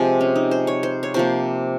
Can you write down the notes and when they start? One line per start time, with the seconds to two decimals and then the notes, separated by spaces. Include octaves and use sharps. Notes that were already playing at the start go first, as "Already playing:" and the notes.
Already playing: C3 F3 G#3
0.21 C#4
0.36 D#4
0.51 C5
0.67 C#5
0.83 C5
1.03 C#5
1.14 C3 F3 A#3 C5